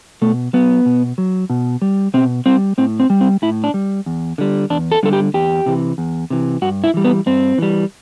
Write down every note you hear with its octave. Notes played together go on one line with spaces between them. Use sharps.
B2 A3
F#3 B3
B2
F#3
B2
G3
B2 C4
G3 C4
A2 C4
C4
G3
C4
A2 E4
D4
G3
E2
D3 G3
E2 D4
A4
D3 G3 A4
G4
E2 G4
C3 E3
E2
C3 E3
G2 F#4
E4
E3 G3
B3
G2 C4
E3 G3